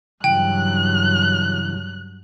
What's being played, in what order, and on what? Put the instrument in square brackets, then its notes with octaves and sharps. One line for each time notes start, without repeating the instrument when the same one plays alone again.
[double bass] G2 F#3 [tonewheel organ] C#3 E3 [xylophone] G5 [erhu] F#6